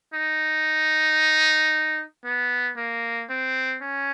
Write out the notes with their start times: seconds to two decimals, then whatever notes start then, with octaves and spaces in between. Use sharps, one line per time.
0.14 D#4
2.25 B3
2.77 A#3
3.30 C4
3.82 C#4